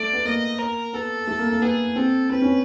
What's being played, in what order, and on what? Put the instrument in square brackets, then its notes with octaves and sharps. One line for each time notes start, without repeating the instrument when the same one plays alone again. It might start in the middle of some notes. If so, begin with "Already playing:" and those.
Already playing: [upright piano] A3 [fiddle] D5
[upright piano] B3
[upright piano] A#3 [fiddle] D#5
[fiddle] A#4
[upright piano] B3 [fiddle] A4
[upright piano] A3
A#3
A#3
[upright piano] B3 [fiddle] G#4
[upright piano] C4 [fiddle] A4
[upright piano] C4 [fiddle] B4
[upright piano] C#4